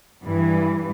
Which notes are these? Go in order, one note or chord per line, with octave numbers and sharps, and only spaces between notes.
G2 E3